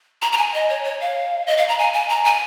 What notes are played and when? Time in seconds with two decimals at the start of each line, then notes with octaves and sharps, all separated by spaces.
0.22 A#5
0.32 A#5
0.38 G#5
0.54 D#5
0.69 C#5
0.84 C#5
1.01 F5
1.47 D#5
1.58 F5
1.68 A#5
1.79 G#5
1.93 G#5
2.09 A#5
2.25 G#5